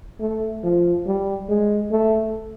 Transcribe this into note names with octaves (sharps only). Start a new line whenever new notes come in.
A3
F3
G3
G#3
A3